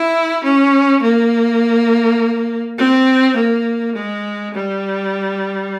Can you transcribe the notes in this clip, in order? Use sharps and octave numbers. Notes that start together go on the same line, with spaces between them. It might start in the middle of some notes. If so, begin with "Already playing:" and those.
Already playing: E4
C#4
A#3
C4
A#3
G#3
G3